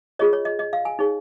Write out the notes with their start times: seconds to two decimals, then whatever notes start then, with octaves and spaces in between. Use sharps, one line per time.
0.19 F4 G#4 C#5 D#5
0.33 C#5
0.45 D#5
0.59 D#5
0.73 F5
0.85 G#5
0.99 D#4 G#4 C#5